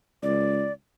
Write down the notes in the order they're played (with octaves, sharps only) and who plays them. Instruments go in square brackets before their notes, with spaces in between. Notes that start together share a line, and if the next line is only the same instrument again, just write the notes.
[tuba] C#2 [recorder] D5